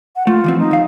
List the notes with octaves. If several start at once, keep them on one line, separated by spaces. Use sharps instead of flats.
F#5
A3 F4
E3 F3 C4
D#4
D#2 F5